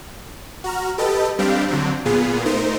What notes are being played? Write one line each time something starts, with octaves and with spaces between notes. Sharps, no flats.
F#4 A#5 F6
G4 A4 B4 D#5 A5
G3 C4 D4 G4 F5
D3 F#3 C4
A#2 B3 F4 G#4
A3 D#4 A#4 C5